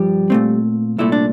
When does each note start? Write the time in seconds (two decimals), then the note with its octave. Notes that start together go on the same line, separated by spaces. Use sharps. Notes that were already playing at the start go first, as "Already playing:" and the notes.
Already playing: G2 F3 G3 G4
0.30 A#2 A3 C4
0.98 C2 A#2 A3 E4
1.12 D4